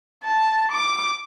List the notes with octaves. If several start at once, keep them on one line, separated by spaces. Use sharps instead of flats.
A5
D6